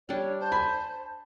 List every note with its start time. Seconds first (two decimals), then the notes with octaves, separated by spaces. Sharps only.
0.09 G3 D4 C#5
0.40 C5 A5
0.52 G#5 B5